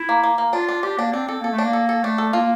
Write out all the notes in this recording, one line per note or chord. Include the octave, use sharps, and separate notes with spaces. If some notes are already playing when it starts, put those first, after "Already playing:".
Already playing: E4
A#3
A#3
A#3
D4 F4
D4
D4 G4
A#3 D4
C4 D4
C4 A4
A#3 A4
A3
D4
A#3
A4
A4
A3 D4
A4
A#3 F4